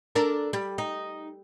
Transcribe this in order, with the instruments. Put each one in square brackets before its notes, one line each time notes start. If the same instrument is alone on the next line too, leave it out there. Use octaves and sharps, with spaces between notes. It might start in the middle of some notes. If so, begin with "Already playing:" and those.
[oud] D4 A4 A#4
G3
D#4